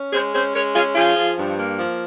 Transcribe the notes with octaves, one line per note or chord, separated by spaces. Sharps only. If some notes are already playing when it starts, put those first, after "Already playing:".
Already playing: C#4
G#3 G#4 C5
C#4 G#4 C5
G#3 A#4 C#5
C#4 F4 G#4
F3 F4 G#4
F3
G2
A#3
F3